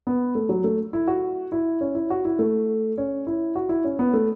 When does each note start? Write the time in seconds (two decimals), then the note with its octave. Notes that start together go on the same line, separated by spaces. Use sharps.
0.07 B3
0.35 A3
0.49 F#3
0.64 A3
0.93 E4
1.07 F#4
1.52 E4
1.81 C#4
1.95 E4
2.10 F#4
2.25 E4
2.39 A3
2.98 C#4
3.27 E4
3.56 F#4
3.69 E4
3.84 C#4
3.99 B3
4.14 A3